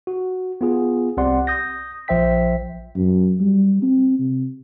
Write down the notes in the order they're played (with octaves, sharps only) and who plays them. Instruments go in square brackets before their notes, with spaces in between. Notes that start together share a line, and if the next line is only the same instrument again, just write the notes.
[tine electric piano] F#4
B3 F4 G#4
C2 C4 G4 D5 F#5 C6
D#6 G6 A#6
A#1 F3 C5 E5 G5 B6
[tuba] F#2
G3
C4
C3